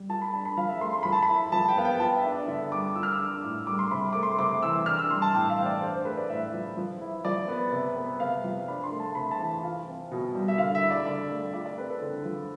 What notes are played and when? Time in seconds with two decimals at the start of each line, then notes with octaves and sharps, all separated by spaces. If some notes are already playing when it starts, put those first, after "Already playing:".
Already playing: G3
0.09 F4 A5
0.22 B5
0.33 D4 A5
0.45 B5
0.57 F3 F5
0.69 E5
0.81 A3 C6
0.93 C6
1.03 F3 B5
1.12 A5
1.22 B5
1.28 E4
1.52 F3 A5
1.68 G5
1.76 B3 F5
1.85 G5
2.00 F4 A5
2.16 E5
2.24 D4
2.32 D5
2.48 D3 E5
2.72 G3 D6
2.95 F4 E6
3.03 F6
3.12 E6
3.19 D4
3.28 D6
3.43 A2
3.67 G3 D6
3.79 C6
3.91 C3 B5
4.13 A3 D6
4.23 C6
4.39 C3 D6
4.62 E3 E6
4.86 D4 F6
4.99 E6
5.10 G3 C6
5.22 A5
5.34 A2 G5
5.50 F5
5.58 E3 C5
5.66 D5
5.81 D4 C5
5.94 C5
6.05 A3 B4
6.17 D5
6.29 A2 E5
6.53 F3
6.77 F3
7.01 E4
7.25 F3 D5
7.48 B3
7.72 C3
7.96 B3
8.20 C3 F5
8.44 F3
8.68 D4 B5
8.84 C6
8.92 A3
9.00 A5
9.15 C3 B5
9.31 A5
9.39 E3
9.63 F4 F5
9.87 C4
10.11 B2
10.35 G3
10.48 E5
10.58 D3 F5
10.75 E5
10.82 E4
10.90 D5
11.06 D3 D5
11.30 A3
11.53 F4 D5
11.66 D5
11.78 C4 B4
11.90 A4
12.02 D3
12.25 F3